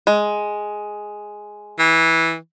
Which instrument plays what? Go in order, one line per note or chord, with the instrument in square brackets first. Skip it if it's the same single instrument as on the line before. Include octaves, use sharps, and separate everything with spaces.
[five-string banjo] G#3
[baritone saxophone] E3